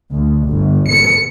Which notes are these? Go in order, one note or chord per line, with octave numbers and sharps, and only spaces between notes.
D2
G1
C#7